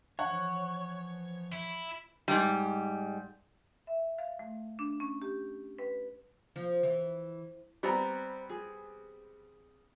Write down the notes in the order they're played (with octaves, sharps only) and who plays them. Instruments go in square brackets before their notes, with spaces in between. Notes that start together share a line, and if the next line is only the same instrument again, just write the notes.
[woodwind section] E3 F3 [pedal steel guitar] C#5 [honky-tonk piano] F#5
[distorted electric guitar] E4
[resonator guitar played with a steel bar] G#2 G3
[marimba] E5
F5
A3
D4
C#4
G4
B4
[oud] F3
E3
[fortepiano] G3 B3 C4 [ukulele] C5 D5 A#5
[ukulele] G#4